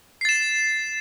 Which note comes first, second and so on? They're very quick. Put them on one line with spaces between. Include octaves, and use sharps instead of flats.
C7 A6 E7